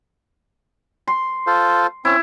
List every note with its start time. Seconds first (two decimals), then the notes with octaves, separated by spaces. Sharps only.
1.08 C6
1.47 F4 A4 C5
2.05 C4 C#4 E4